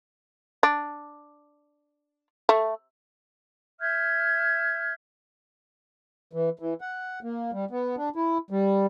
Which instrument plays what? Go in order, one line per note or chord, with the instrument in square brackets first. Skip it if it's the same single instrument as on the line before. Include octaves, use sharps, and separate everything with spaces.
[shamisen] D4
A3
[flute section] E5 F6 G6 G#6
[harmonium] E3
E3
F#5
A#3
G3
B3
D4
E4
G3